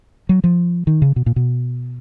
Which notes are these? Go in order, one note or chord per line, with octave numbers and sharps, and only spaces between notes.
F#3
F3
D#3
C#3
B2
A#2
B2